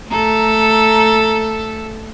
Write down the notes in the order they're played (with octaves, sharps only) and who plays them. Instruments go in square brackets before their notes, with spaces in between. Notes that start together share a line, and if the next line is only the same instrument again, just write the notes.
[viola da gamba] A3 A4 [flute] A#5